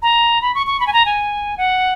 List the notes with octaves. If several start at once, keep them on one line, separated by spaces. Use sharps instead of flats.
A#5
B5
C#6
C#6
B5
G#5
A#5
G#5
F#5